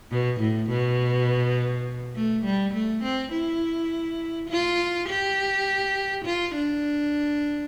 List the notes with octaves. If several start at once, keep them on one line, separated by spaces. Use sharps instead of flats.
B2
A2
B2
A3
G3
A3
C4
E4
F4
G4
F4
D4